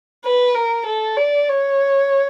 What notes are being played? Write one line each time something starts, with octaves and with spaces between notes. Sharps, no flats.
B4
A#4
A4
D5
C#5